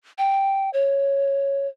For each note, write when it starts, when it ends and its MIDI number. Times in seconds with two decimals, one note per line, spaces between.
0.18 0.70 79
0.73 1.68 73